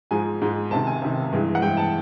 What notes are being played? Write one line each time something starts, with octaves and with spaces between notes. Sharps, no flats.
G#2 F3 G#3 G#5
G#2 F3 G#3
C#2 C3 D#3 A5
G#5
C#2 C3 D#3
G2 E3 G#3
F#5
G2 E3 G#3 G5
A5